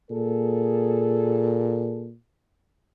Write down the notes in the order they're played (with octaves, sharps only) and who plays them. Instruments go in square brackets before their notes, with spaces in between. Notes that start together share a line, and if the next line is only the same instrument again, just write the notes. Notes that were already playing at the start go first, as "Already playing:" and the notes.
[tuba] A#2 [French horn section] A#3 G#4 A4